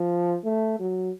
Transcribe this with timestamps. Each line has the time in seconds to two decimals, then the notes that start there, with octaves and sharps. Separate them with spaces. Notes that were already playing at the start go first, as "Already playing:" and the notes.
Already playing: F3
0.44 A3
0.79 F#3